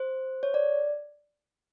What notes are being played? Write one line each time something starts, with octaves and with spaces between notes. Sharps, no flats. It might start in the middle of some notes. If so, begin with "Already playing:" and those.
Already playing: C5
C#5
D5